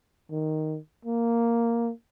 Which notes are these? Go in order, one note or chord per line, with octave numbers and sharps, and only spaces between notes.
D#3
A#3